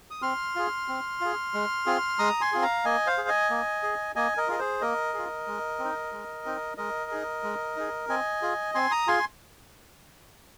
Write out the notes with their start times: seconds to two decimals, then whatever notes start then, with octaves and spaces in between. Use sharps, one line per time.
0.11 D#6
0.22 C4 C6 F6
0.55 F4 G#4
0.88 C4
1.21 F4 G#4
1.54 G#3
1.86 C4 F4 G#4
2.19 G#3 A#5 D#6
2.41 G#5 C6
2.52 C4 F4 G#4
2.62 F5 A#5
2.85 A#3 D#5 G#5
3.07 C5 F5
3.18 G#4
3.28 D#5 G#5
3.50 A#3
3.83 G#4
4.16 A#3 D#5 G#5
4.37 A#4 D#5
4.48 F4 G#4 D#5
4.59 G#4 C5
4.81 A#3 A#4 D#5
5.14 F4 G#4
5.47 G#3
5.79 C4
5.84 D#4
6.12 G#3
6.46 C4 D#4
6.77 G#3 A#4 D#5
7.11 D#4 G#4
7.43 G#3
7.76 D#4 G#4
8.09 C4 D#5 G#5
8.42 F4 G#4
8.75 C4 G#5 C6
8.91 A#5 D#6
9.07 F4 G#4 G#5 C6